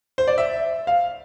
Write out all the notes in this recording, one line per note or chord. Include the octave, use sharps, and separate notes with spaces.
C5
D5
E5
F5